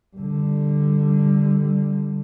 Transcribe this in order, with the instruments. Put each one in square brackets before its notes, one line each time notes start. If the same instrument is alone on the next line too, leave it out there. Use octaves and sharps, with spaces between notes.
[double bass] D3 G3